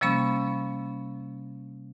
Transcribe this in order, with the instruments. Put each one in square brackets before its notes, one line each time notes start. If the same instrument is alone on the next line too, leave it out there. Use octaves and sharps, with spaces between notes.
[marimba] C3 F3 G3 A#3 C#4 B5